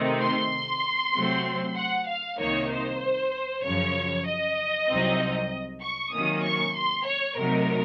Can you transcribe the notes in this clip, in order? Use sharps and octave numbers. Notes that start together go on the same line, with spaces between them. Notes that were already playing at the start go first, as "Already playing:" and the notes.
Already playing: C3 D#3 A3 C4 D#4
C6
C3 F#3 A3 C4
F#5
F5
C2 C3 D#3 A#3 D#4 C#5
C5
F#2 C#3 F3 C#5
D#5
C2 C3 F#3 C4 D#4
C#6
C3 D#3 F#3 A#3 C#4 D#6
C#6
C6
C#5
C3 F#3 A3 D#4 A#4